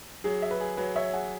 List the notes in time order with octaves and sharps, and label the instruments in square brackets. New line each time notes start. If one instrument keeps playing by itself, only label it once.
[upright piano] F#3 [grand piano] G#4
[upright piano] E5
[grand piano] B4
[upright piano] G#4
[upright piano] F#3 [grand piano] B4
[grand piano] C#5 [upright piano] E5
[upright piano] G#4 [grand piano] F#5